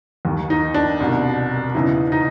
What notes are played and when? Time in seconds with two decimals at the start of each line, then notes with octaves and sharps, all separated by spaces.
0.25 D#2 D#3
0.50 D#4
0.74 D4
1.00 C2 B2
1.75 E2 C#3 E3 D#4
2.12 D#4